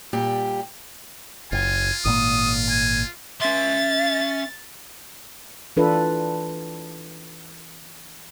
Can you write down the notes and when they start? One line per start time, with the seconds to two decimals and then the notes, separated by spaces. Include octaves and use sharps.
0.13 A#2 G3 G4
1.52 F#1 F4 G#5
2.05 G#1 A#2 A#3 D#6
2.70 G#5
3.40 C#4 E5 C6 A6
5.77 E3 D4 F4 A4 B4